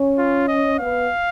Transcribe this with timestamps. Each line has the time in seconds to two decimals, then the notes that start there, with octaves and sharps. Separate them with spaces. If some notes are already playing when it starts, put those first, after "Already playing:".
Already playing: C#4
0.18 F4
0.48 D#5
0.79 B3 F5